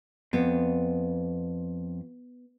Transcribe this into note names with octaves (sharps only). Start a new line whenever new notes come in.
F2 B3